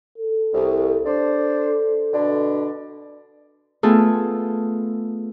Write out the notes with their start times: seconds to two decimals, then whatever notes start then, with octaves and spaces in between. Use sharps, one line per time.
0.18 A4
0.54 C2
1.06 D4 C5
2.13 B2 D3 D4
3.83 A3 B3 F4 G#4 A4